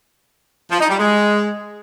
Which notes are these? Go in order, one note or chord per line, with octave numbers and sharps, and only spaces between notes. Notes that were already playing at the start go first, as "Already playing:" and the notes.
F3
D#4
G3
G#3